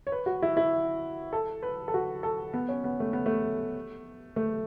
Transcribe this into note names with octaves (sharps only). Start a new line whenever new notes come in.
C#5
B4
F#4
E4
E4
A4
B4
A4
F#4
A4
B3
C#4
B3
A3
B3
A3
A3